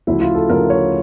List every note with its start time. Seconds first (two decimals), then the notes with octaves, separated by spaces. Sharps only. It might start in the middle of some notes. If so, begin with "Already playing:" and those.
0.07 D2 C#3 F3 E4
0.21 F4
0.35 A4
0.49 D2 C#3 F3 A#4
0.70 C#5